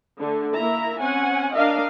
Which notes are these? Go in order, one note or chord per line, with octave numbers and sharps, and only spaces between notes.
D3 A3
A#3 E4 E5 A#5
C4 C#4 F#5 G#5
D4 A#4 D#5 F5